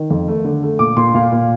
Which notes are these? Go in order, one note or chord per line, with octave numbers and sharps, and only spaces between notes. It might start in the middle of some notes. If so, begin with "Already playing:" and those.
Already playing: D#3
F2
A3
D3
A3
A#2 D6
A#2 C6
A#2 F5
A#2